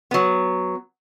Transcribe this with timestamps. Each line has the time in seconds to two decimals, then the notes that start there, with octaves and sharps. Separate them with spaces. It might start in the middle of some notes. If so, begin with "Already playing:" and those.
0.11 F#3 B3